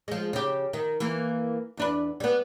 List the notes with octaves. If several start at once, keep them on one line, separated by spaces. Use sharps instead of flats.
F3 G#3
C#3 G4
D#3
E3 A#3
E2 D4 B4
G3 B3